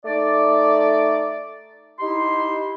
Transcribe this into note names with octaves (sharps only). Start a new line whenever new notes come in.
A3 D#4 D5
D#4 E4 G4 C6